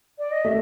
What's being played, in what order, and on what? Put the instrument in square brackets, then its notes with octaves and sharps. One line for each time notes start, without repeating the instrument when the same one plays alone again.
[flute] D5
D#5
[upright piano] A3 [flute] E5